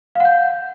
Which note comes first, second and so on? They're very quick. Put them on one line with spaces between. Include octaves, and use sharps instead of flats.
F5 F#5 G6